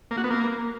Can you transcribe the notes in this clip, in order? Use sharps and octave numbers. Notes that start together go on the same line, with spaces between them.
A#3
F#4
B3
A#3